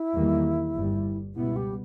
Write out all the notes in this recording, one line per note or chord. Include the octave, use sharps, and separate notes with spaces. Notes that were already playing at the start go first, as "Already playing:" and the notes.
Already playing: E4
E2 D#3 G3 A#3
G1 G2 G3
C#2 B2 G3 B3 E4
G4